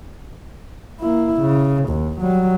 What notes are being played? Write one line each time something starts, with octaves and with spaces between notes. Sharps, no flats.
A#3 E4
C#3
D#2
F#3 G3